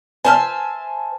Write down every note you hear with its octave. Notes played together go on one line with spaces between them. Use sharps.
C5 C#5 E5 G#5 A5 F6